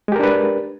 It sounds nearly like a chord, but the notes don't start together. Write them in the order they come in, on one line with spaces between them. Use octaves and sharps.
G#3 G4 A#4 D4 B4